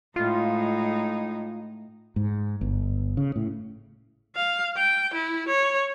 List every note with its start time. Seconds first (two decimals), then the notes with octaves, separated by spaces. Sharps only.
0.16 A2 G#3 D#4 F4
2.16 G#2
2.61 G1
3.17 C#3
3.36 A2
4.36 F5
4.77 G5
5.14 E4
5.49 C#5